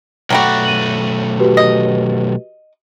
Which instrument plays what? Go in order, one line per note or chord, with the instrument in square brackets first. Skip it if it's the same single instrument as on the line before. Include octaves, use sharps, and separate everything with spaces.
[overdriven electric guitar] B1 A3 [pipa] F#3 G3 F#4
[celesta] D#7 F#7
F#4 G4 B4
[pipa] D#5